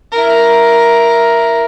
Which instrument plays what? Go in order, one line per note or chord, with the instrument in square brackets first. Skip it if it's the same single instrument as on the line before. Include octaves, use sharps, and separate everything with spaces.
[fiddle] E4 A#4